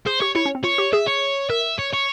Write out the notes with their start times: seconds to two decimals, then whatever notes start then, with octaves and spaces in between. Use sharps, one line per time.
0.06 G#4 C5
0.21 G4 C#5
0.35 E4 C#5
0.46 C#4
0.55 C4
0.64 F4 C#5
0.78 G4
0.93 G#4 E5
1.07 C#5
1.50 A#4 E5
1.79 C#5
1.93 C#5